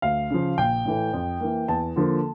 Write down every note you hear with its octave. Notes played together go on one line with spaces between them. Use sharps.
D2 F5
C#3 F3
A#1 G5
A2 E3 A3
F2
E3 A#3
E2 A5
D3 F3 A#3